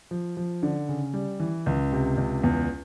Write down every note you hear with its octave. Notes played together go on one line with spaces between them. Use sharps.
F3
F3
D3
C#3
G3
E3
C#2
C3
C#2
E2